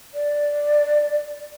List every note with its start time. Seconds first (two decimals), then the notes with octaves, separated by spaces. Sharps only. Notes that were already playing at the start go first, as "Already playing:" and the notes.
0.14 D5